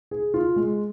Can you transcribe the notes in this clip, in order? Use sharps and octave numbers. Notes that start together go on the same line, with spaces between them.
G#4
F4
G#3